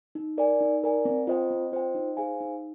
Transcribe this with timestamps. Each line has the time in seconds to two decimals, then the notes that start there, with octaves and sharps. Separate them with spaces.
0.15 D#4
0.38 A#4 D5 G#5
0.61 D#4
0.84 A#4 D5 G#5
1.05 C4
1.27 F4 C5 D#5 G5
1.50 C4
1.72 F4 C5 D#5 G5
1.95 D#4
2.17 G#4 C5 F5 G#5
2.40 D#4